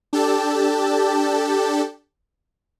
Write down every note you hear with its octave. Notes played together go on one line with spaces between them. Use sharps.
D4 G4 A4 A5